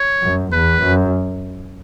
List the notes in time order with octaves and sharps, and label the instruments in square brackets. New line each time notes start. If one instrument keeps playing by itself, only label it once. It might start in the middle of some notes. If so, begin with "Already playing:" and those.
Already playing: [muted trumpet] C#5
[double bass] F#2
[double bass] E2 [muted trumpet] B4
[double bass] F#2